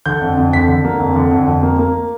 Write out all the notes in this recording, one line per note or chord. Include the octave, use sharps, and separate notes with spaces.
D3 G6
F2
F2
D3 B6
D3
A#3
F2
D3
F2
F2
A#3
A#3